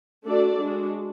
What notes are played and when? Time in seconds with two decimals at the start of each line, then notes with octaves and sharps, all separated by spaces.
0.25 A3 D4 F#4 A4 D5
0.60 G#3 D4 F#4